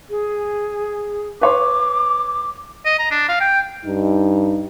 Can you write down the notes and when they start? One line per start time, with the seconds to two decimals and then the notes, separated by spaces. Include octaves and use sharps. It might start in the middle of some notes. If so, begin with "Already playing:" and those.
0.10 G#4
1.41 B4 C#5 C6 D6
2.85 D#5
2.99 A#5
3.11 D4
3.29 F5
3.41 G5
3.86 G2 D#4